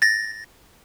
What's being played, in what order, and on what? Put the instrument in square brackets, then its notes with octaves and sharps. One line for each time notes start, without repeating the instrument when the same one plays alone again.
[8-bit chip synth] A6 A#6